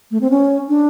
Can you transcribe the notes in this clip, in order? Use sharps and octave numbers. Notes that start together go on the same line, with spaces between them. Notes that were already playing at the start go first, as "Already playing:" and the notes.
A3
C4
C#4
D4